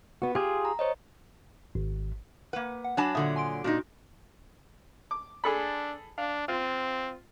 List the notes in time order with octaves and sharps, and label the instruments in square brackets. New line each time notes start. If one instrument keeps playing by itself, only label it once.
[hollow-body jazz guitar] B3 F#4
[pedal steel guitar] F4 G#4 [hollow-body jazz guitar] G4 [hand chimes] C6
[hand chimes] A#5
C5 C#5 D#5
[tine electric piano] G#1
[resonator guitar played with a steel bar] A#3 B4 [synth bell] F#5
[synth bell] F#5
[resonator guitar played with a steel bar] F#3 D4 A5 [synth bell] G#5 B5 D6
[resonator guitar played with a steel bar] A#2 D3 F#3 [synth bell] E5 D#6
[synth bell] G#5 C6 D7
[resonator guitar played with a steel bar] A#2 D4 D#4 [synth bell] F#4
[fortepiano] D6
[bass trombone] D4 [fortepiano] G#4 A4 B5
[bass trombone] D4 [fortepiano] F5
[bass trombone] C4 [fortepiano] F4